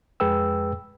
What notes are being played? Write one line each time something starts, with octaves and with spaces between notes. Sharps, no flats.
F2 G#3 G#4 B4 G5 E6